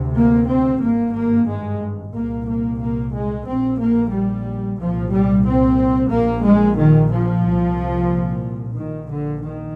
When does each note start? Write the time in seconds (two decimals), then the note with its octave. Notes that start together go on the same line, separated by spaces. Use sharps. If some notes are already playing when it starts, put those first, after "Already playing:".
Already playing: D2 C3
0.18 A#3
0.51 C4
0.84 G#1 G2 A#3
1.18 A#3
1.49 G#3
2.16 C2 A#2 A#3
2.49 A#3
2.81 A#3
3.15 G#3
3.48 A#1 A#2 C4
3.81 A#3
4.14 G3
4.79 C2 A#2 F3
5.13 G3
5.46 C4
6.12 A#1 A#2 A#3
6.45 G#3
6.78 D#3
7.11 F3
7.44 C2 A#2
8.77 A#1 A#2 D#3
9.09 D3
9.42 D#3